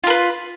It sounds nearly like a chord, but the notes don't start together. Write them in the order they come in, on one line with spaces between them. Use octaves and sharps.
F4 A#4 B4